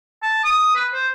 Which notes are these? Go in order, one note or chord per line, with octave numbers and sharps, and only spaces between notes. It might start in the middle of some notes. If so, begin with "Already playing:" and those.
A5
D#6
B4
C5